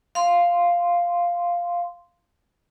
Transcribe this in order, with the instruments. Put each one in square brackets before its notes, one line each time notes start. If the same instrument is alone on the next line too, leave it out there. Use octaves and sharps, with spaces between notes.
[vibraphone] F5 C6